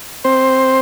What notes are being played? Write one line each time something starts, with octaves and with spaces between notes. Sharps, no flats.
C4 C5